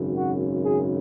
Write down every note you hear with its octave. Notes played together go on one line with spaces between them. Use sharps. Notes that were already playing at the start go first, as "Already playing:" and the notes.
Already playing: G#1 F#2 C#3
F#4
G#4